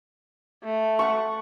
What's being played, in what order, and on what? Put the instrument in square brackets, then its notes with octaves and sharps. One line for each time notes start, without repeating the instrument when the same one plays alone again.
[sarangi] A3
[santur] F#5 C#6